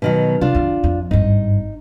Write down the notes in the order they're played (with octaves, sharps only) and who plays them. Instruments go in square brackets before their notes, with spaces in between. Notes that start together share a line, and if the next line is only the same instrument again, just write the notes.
[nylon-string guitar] B2 D#3 F#3
[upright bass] C3 [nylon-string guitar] D4 F4
[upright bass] F#2 D#3
F2
[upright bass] G#1 G2 [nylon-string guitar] D#4